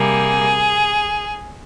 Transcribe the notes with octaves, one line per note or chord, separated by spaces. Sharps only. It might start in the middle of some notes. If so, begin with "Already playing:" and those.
Already playing: C3 G3 A#3 G#4